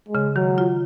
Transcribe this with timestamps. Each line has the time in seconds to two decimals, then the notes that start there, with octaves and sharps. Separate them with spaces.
0.09 G#3
0.15 C#3
0.36 D#3 F#3
0.58 F4